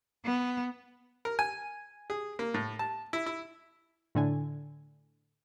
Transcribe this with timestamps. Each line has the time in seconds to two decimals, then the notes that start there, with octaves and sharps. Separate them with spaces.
0.24 B3
1.25 A#4
1.39 G#5
2.10 G#4
2.39 A#3
2.54 A2
2.79 A5
3.13 E4
3.26 E4
4.15 A2 D3 G#5